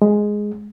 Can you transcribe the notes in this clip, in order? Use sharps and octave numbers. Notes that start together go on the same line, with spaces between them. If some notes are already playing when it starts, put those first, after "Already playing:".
G#3